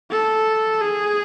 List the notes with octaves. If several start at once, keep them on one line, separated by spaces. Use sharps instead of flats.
A4
G#4